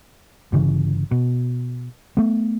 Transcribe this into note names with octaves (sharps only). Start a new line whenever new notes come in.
G1 C#3 E3
B2
A3 B3